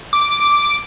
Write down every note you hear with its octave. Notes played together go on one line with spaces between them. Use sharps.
D6